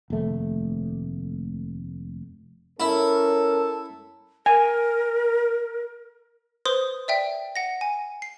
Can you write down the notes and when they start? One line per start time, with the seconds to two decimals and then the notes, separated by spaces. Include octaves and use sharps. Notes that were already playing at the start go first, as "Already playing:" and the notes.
0.10 F1 D#2 A3
2.80 C#4 E4 A4 A#4
4.46 A#4 G#5
6.66 B4 C5 C6 D#6
7.08 D5 E5 G5
7.56 F#5 A#6
7.81 G#5
8.22 C7